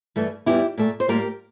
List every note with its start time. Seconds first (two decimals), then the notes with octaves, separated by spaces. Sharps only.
0.16 G2 E3 A3
0.46 E2 E3 G3 E4 G4
0.78 A#2 A3
1.00 C5
1.08 A2 G3 A#3 G4 A#4